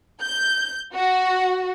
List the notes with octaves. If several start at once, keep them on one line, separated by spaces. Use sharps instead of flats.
G6
F#4